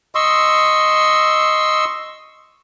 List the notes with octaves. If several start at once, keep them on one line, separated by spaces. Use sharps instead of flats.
D#5 C6 C#6 E6